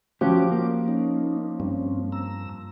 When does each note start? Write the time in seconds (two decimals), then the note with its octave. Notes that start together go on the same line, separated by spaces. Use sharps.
0.21 F3 C#4 F#4 G4 D6
0.51 A#3
0.88 C#4 D#4
1.60 G2 C4 C#4
2.12 A#5 E6